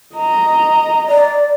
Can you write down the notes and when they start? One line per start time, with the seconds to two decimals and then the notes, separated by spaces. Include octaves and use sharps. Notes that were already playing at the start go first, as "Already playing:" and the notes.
0.16 D#5 A#5
1.09 D5